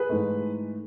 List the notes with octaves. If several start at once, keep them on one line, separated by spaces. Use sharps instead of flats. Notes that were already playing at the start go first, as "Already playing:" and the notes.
Already playing: G#4 B4
G#2 E3 A3 D#4